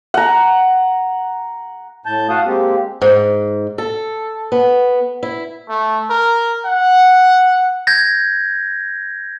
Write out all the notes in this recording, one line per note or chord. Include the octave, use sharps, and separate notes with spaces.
F#5 A#5
A2 A5 G6
F#4 F5 F#5 A5 D#6
G#3 A#3 C4 G4
G#2
A4
B3
E4
A3
A#4
F#5
G6 G#6 A#6